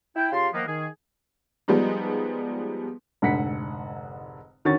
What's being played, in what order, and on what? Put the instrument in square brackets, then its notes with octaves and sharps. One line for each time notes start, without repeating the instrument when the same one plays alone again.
[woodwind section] E4 G5
C#3 F4 G4 F5 A5 C6
D#3 F3 A#3 B3
D#3 G#4
[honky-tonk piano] F3 G3 G#3 B3 D#4
[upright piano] F1 G#2 D3 F#5 B6 C#7
D3 D#3 C#4 F#4 C#6 A6